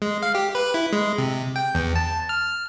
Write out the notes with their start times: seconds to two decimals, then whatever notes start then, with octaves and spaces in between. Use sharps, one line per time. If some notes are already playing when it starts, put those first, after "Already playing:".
0.02 G#3
0.23 F5
0.35 G4
0.55 B4
0.74 E4
0.93 G#3
1.18 C3
1.56 G5
1.75 E2
1.96 A5
2.29 F6